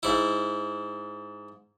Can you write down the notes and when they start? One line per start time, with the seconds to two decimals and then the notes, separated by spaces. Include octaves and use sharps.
0.03 G#2 E4